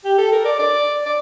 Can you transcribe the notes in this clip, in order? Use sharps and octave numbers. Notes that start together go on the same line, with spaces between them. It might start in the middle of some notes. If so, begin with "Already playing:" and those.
G4
A4
A#4
D5
D5
D5